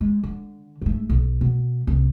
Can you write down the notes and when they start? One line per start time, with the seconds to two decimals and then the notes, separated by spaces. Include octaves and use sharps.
0.01 G#3
0.23 D3
0.82 G#2 A3
1.09 B1
1.41 B2
1.87 C2